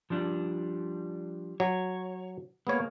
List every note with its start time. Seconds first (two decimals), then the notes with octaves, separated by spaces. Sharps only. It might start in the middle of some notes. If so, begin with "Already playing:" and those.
0.10 F3 G3 D4
1.60 F#3 C#5
2.67 G#3 A#3 B3 C#5